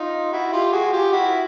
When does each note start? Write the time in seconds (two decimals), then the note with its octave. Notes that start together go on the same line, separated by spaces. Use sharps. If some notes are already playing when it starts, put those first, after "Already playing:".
Already playing: D#4 F4
0.33 E4 F#4
0.53 F4 G4
0.72 F#4 G#4
0.92 F4 G4
1.12 E4 F#4